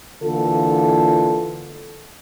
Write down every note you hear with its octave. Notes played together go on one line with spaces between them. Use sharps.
D3 E3 A#3 F4 A4